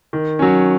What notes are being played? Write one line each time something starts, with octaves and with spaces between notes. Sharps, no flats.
D#3
F#3 C#4